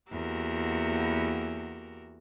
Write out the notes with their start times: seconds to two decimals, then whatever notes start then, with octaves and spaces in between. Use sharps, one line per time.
0.11 E2 A#3 F#4 G4 A#4 E6